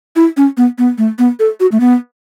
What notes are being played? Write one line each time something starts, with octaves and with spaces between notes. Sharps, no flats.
E4
C#4
B3
B3
A3
B3
A4
F#4
A3
B3